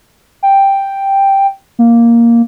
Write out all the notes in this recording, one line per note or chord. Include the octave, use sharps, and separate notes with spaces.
G5
A#3